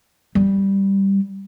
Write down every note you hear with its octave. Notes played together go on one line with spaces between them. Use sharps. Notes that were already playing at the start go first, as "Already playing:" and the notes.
G3